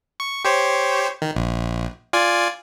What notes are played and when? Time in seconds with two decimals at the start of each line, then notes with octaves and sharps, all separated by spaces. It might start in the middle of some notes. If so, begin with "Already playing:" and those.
0.20 C#6
0.45 G4 C5 C#5
1.22 D#3
1.35 A#1
2.13 F4 D5 G#5